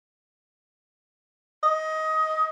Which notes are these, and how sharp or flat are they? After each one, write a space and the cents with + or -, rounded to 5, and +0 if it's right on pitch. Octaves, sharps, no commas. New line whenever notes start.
D#5 +15